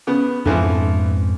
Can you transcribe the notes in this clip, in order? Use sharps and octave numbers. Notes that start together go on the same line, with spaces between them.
C#3 B3
F2 G#2 D3 E3 F3 C4